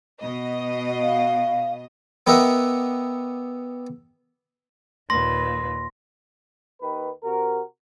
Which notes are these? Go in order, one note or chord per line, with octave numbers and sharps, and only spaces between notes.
B2 D#5
F5
B3 G4 A#4 D#5 E5 F#5
D#2 A#2 B4 C6 A#6
D#2 D#3 B4
C3 F#4 A#4